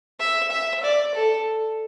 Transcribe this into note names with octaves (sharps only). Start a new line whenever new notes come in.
E5
E5
D5
A4